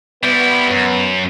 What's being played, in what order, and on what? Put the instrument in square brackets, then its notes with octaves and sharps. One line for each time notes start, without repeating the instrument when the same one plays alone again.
[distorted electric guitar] G3 E4 [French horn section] B3
[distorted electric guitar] F#2